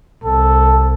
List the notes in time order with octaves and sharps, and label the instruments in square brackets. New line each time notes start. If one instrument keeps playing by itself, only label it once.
[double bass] C2 [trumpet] A4